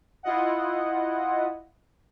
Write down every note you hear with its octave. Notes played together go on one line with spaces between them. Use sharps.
E4 F4 D#5 F#5